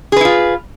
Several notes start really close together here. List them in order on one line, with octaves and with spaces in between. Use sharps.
G#4 B4 E4 F4